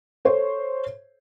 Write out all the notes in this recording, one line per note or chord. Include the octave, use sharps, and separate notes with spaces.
A4 C5 C#5